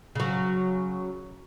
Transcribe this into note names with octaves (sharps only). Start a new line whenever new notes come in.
C#3 F#3